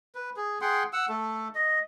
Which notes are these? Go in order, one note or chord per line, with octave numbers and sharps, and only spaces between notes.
B4
G#4
G#4 F#5 G5 C6
F#5 E6
A3 A4
D#5